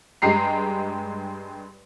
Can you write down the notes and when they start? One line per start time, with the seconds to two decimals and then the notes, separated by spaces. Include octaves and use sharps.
0.22 G2 G#3 G4 A#5 C7